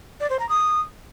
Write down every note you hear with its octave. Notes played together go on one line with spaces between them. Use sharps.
D5
C5
A#5
D#6